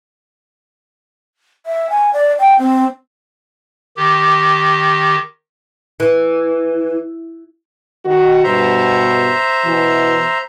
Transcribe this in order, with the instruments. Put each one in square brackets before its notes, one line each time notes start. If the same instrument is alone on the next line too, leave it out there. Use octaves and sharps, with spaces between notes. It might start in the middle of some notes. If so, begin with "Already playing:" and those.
[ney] E5
G#5
D5
G5
C4
[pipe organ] D#3 G4
[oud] E3
[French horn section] D#3 F#4
[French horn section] G2 B2 [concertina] C5 E5 A#5
[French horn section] B2 E3